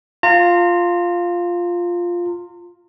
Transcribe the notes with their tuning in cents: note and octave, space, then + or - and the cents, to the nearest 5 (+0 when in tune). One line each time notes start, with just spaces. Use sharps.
F4 +0 A#5 -35